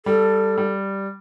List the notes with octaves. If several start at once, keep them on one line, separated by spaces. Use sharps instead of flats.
G3 A4
G3